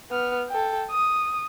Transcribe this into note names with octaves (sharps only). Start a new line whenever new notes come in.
B3 F6
A4 G5
D#6